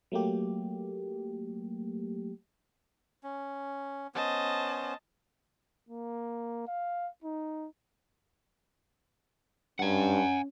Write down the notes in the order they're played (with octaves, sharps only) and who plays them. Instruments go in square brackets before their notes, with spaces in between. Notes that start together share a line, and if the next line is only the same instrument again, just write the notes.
[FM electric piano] F#3 A3 A#3 G4
[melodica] C#4
[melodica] B3 C#4 C5 [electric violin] D#5 A5
[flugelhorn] A#3
F5
D#4
[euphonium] G2 [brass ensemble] C#4 [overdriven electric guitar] F#5 G#5